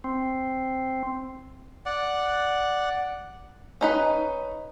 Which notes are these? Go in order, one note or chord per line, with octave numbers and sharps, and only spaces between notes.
C4
D5 F#5
C#4 D#4 B4